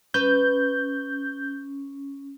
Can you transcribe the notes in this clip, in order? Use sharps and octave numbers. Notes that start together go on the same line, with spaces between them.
C#4 B4 G6